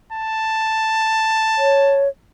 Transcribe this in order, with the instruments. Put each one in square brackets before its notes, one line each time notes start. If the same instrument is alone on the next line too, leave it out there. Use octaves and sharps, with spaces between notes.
[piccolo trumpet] A5
[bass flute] C#5